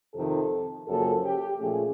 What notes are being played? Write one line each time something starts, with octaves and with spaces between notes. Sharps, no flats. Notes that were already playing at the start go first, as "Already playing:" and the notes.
F2 C3 D#3 A4
F#2 C#3 F3 A#3 A4
G4
A#2 F3 A3 C#4 G#4